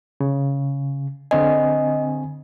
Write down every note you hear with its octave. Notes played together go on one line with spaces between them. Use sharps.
C#3
D3 C4 D#5 G#5